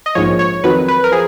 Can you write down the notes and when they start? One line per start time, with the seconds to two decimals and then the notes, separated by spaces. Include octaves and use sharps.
0.06 D#5
0.15 A#1 G#2 F3 C#5
0.39 C#5
0.64 F2 D#3 F#3 B4
0.88 B4
1.04 A#4
1.12 F3 G#4